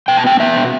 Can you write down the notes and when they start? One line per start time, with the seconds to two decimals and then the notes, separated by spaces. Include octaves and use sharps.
0.08 B2 G5
0.17 A5
0.24 B3 G5
0.40 B3 E5
0.56 B2